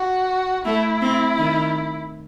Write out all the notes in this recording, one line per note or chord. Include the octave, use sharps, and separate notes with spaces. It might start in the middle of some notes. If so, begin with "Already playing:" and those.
Already playing: F#4
A3 E4
C4
D#3